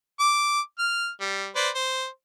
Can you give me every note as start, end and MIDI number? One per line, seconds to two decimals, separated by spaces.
0.20 0.60 86
0.79 1.09 89
1.21 1.49 55
1.56 1.69 71
1.56 1.69 72
1.56 1.69 74
1.75 2.06 72